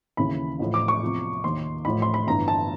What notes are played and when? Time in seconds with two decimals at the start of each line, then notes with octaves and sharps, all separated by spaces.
0.17 D#2 C#3 E3 B5
0.59 A1 A2 F3
0.74 D6
0.88 C#6
1.02 E2 C3 F3
1.44 D#2 D#3 C6
1.85 A1 A2 F3 B5
2.02 C6
2.14 B5
2.27 G1 G2 E3 A#5
2.48 A5